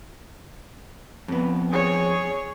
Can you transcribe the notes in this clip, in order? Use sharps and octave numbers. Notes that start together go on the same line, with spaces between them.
F2 B3
G#4 C#5